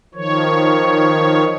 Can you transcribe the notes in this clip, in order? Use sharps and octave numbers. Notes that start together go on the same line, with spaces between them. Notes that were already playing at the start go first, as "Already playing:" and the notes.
D#3 F3 C#5